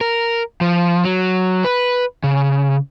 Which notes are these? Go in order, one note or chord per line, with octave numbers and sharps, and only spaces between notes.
A#4
F3
F#3
B4
C#3